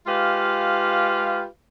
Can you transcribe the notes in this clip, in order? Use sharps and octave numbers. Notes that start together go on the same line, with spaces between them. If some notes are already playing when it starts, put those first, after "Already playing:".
G#3 F4 G4 B4 F5